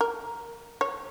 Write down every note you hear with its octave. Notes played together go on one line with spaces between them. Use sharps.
A#4
C#5